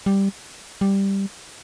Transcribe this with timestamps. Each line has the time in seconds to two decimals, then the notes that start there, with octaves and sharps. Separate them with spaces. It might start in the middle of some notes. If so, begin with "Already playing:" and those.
0.06 G3
0.81 G3